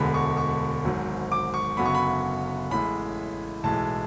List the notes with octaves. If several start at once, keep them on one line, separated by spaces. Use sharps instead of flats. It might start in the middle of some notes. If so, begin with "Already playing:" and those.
Already playing: E1 D2 D3 G#3 B3 B5
C#6
C#6
G#1 G#2 F#3
D6
C#6
F#1 F#2 D3 F#3 B3 B5
C#6
B5
A1 A2 G#3 B5
B1 A2 E3 G#3 A5